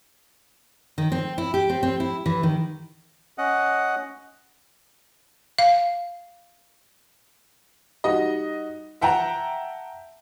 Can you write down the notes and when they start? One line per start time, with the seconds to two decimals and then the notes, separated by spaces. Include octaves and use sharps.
0.98 D#3
1.12 C4
1.38 E4
1.54 G4
1.70 C4
1.83 C4
2.00 E4
2.26 E3
2.43 D#3
3.38 C#4 D#5 F#5
5.59 F5
8.04 G3 D#4 F#4 D#5
9.01 E5 F#5 G5 A5 A#5